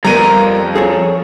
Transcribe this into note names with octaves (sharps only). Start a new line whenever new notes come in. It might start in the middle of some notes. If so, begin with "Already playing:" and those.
F2 G3 B3 A#4 A#5 D#7
G#4 A4 C#5